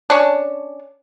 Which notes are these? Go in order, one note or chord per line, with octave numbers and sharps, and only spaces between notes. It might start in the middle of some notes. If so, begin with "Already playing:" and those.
C#4 D4